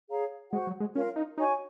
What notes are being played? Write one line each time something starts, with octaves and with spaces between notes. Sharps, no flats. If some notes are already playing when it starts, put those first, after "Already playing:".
G#4 C#5 F5 A#5
G#3 F#4 C5 F#5
F#3
G#3
C#4 F4 A#4 F5
D#4
D#4 F#4 C#5 G#5 C#6